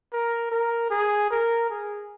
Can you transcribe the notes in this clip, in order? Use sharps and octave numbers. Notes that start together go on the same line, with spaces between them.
A#4
A#4
G#4
A#4
G#4